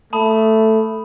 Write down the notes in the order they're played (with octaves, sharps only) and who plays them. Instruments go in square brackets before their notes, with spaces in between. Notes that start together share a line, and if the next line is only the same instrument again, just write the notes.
[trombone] A3 [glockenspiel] A5 B5 D#6